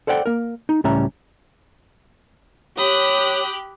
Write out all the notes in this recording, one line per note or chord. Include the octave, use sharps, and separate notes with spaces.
A4 C5 D5 F#5 G5
A#3 A#4
D#4
C#2 A2 G3 C#4 E5 A#5
G4 C#5 B5 D#6 F#6